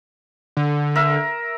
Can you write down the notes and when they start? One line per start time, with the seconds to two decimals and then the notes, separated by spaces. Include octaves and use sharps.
0.57 D3
0.96 A#4 E5